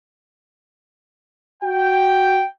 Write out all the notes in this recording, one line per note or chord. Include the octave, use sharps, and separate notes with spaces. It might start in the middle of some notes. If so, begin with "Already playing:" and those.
F#4 G5